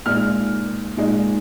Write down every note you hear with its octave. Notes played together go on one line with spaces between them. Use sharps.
A#2 G#3 D#4 F6
A#2 G#3 D#4